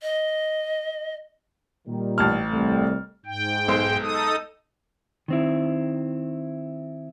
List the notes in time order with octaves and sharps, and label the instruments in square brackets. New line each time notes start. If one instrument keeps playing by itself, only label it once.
[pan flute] D#5
[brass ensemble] A#2 D#3 G3
[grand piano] A1 A5 F6
[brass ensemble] C2 G3 A3
[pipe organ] G#2 G5
[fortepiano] B1 G#3 C5
[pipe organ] D#4 A4 D#6
[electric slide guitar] D#3 C4 E4